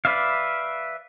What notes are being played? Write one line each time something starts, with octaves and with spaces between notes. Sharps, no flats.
B4 D5 E5 F5